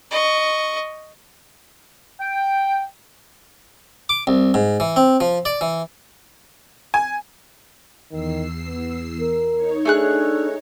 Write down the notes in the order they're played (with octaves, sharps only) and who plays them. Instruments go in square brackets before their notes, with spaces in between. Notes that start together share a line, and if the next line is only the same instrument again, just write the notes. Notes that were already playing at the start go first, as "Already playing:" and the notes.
[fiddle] D#5 C#6
[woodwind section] G5
[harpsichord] D6
C2
G#2
E3
C4
F3
D5
E3
[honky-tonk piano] G#5
[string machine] E2 E6 C7 [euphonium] D#3
[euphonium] B3
A#4
[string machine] D#4 C#5
[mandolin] A3 G#4 F#6 [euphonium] D4